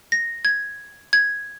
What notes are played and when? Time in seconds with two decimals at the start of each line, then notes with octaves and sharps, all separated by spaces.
0.12 A#6
0.45 G#6
1.13 G#6